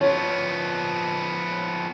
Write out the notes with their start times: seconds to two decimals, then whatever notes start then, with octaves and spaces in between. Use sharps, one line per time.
0.01 F3 B3 C#5